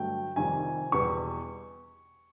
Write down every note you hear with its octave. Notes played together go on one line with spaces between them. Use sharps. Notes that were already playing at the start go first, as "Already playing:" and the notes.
Already playing: G2 D3 F#3 A3 G5
F2 C3 D#3 G3 G#5
E2 B2 G3 C#6